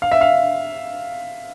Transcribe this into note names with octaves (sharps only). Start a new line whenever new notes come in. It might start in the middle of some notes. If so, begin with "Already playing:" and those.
F5
E5
F5